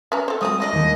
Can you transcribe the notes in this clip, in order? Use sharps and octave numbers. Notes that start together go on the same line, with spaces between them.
C#4 B4 A#5
A4 C5
F3 F#3 G#3 C4 D#6
F#3 D4 D5 D#5
D#2 D#3